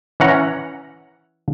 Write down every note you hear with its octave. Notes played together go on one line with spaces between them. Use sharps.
E3 C#4 F#5 A#5